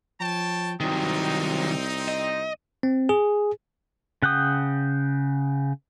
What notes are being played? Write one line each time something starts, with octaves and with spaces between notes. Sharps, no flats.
F3 C#5 G5 A5
C2 D#3 F#3 C4 D#4
D#5
C4
G#4
C#3 F#5 G5 D#6